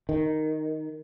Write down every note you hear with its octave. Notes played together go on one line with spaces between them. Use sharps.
D#3